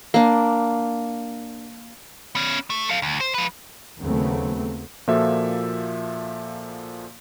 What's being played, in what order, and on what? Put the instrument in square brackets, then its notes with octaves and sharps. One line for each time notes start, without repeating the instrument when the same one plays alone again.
[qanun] A#3 D4
[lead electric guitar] B3 C#4
A3
A4 F5
D2
C5
F3 B4
[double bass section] D#2 C#3 F#3 A3 B3 C4
[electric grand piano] A#2 F3 A#3 F#4 A4 E5